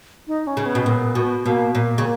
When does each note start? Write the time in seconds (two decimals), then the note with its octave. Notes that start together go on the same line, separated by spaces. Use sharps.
0.27 D#4
0.47 C#4
0.57 C#3
0.66 B3
0.75 B2
0.86 A#2
1.15 B2
1.45 B2 A#3
1.75 A#2 A#3
1.98 C#3